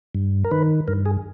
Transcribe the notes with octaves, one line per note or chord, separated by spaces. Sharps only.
G2
A#4
D#3 B4
G2 A#4
G#4